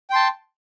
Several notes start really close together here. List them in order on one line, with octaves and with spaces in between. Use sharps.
G5 C6 A5